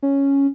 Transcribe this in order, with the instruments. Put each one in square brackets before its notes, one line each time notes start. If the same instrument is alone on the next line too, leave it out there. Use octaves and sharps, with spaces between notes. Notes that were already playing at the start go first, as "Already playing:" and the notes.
[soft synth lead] C#4